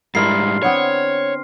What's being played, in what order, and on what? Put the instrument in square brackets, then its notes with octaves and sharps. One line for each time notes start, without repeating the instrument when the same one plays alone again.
[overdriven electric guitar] G#2 G3 [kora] E4 A#4 [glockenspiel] C6 F6 C7
[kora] D3 B3 C4 [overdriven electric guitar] C#5